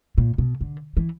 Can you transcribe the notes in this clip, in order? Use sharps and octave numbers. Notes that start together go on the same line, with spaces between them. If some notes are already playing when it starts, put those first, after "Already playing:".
A#2
B2
D3
E3